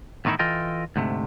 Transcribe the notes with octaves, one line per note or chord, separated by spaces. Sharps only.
E2 A2 D#3 D#4 E4
E3 F4 A4 D#5 G5
D2 G#2 C3 A3